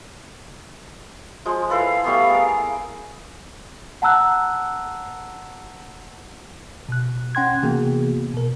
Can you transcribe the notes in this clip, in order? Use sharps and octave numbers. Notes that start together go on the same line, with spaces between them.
F3 G#3
E4 A4 B4 F5
G3 A3 B3 F5
G#4 A#4
F#5 A5 A#5 E6 F#6
B2 F#6
C#4 F#5 G5 C6 F#6 G#6
C3 E3 A#3 B3 F#4 G#4
B2 A#4